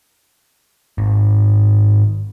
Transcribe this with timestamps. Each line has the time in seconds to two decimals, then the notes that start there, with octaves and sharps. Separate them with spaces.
0.98 G#1